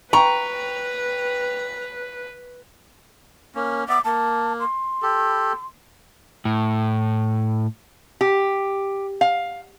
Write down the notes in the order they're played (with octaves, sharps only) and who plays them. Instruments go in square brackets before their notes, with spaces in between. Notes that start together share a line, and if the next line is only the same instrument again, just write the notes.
[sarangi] B4 [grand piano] G5 C#6 [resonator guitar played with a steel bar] A#5
[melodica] A#3 C#4
[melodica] B3 D5 E5 [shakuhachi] D6
[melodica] A#3 [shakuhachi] A5
[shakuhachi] C6
[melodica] G4 A4
[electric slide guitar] A2
[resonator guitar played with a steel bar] G4
F5